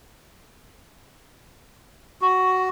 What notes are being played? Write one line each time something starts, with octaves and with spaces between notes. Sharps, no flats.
F#4